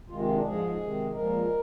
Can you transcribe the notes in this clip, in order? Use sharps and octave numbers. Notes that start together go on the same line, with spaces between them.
C3 D#3 G#3 F4
F4
D4
G#2 F3 G#3 G#4
C3 D#3 G#3
A#2 F3 G#3 A#4